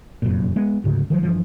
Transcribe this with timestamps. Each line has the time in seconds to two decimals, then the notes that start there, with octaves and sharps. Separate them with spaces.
0.22 F1 F#2 A#2
0.56 G#3 B3
0.84 D2 G#2 C#3
1.10 D#3 F3 F#3
1.23 G2 E3 F3